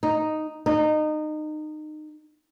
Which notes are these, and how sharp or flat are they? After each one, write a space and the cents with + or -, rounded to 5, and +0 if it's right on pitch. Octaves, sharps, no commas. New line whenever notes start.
D#4 -5
D#4 -25